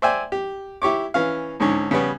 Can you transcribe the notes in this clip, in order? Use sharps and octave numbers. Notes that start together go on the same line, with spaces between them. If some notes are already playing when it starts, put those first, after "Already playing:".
C5 D5 E5 G5 G#5
G4
E4 G4 C#5 D6
E3 C#4 F5
C#2 G#2 D3 C#4
C#3 G3 B3 C#4